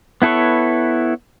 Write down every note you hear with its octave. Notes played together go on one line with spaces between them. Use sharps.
B3 E4 A4 B4 C#5